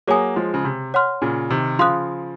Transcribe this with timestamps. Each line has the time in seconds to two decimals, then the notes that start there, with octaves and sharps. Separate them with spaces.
0.07 F#3 A#3 G#4 C#5 G#5 D#6
0.36 F3 G#3
0.54 C#3
0.64 C3
0.94 C#5 F#5 C6 F6
1.22 A#2 C#3
1.50 C3 D#3
1.79 C#3 F3 F5 C6 D#6 F#6